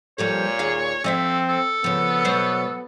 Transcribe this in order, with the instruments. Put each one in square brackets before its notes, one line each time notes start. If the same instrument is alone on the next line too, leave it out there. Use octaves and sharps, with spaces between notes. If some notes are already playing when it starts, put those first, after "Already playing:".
[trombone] A#2 [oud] F3 G3 A4 [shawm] C#5
[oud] D#2 G#4 F5
[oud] F3 D#5 E5 [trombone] C4 [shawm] A4
[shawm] A4
[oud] C#3 F3 [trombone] B3
[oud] B2 F#3 C5